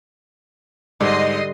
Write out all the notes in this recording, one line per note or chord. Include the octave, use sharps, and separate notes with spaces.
G#2 D3 G3 D#5 C6